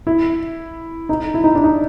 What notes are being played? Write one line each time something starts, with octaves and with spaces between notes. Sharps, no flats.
E4
D#4
E4
D#4
D4
D#4